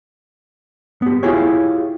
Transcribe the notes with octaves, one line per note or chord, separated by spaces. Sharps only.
B3 G4
E4 F4 G4 G#4 C#5